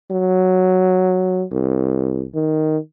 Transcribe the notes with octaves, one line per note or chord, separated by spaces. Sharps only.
F#3
C2
D#3